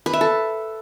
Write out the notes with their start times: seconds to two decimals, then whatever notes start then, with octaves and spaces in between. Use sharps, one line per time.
0.06 B4
0.13 E5
0.21 A4